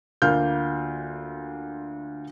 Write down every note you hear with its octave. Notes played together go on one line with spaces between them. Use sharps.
D2 A#3 F4 F6 G6